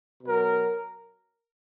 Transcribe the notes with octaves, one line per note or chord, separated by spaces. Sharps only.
B2 F#3 A#4